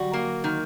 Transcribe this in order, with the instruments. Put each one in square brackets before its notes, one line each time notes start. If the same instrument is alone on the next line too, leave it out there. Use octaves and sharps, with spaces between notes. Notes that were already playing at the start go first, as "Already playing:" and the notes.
Already playing: [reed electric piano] D3 F#3 [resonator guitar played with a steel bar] G3 F#4
[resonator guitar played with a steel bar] A#3
D#3